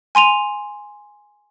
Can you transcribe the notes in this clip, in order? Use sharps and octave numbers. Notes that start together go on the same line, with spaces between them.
G#5 C6 D#7 F7